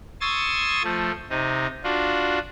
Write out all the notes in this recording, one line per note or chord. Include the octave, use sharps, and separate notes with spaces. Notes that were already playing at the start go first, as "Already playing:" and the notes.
C6 C#6 D#6 E6 G#6 A6
F3 A3
C3 D#4
D4 F4 F#4